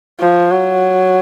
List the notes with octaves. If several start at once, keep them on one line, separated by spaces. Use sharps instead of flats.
F3
F#3